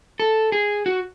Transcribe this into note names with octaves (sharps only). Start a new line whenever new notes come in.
A4
G#4
F#4